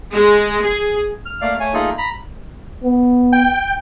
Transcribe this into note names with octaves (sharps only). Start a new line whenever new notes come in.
G#3
G#4
F6
A3 A#3 D5 F5 F6
A3 C#5 G#5
A3 A#3 D#4 F4 G#4 A4
A#5 B5
B3
G5